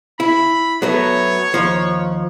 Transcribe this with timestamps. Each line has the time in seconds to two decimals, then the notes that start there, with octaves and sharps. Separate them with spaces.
0.20 E4 B5
0.82 F#3 A3 B3 C#5
1.54 D#2 F3